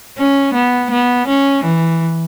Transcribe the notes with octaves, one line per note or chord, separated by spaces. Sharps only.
C#4
B3
B3
C#4
E3